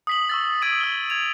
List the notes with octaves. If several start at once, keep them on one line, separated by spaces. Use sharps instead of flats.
D#6 B6 F#7
C#6 E6 A6
D#6 G#6 D7 D#7
E6 G7
G#6 F7